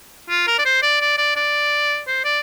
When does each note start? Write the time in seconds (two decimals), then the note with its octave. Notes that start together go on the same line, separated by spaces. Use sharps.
0.29 F4
0.47 A#4
0.59 D5
0.65 C5
0.82 D5
1.01 D5
1.18 D5
1.36 D5
2.07 C5
2.24 D5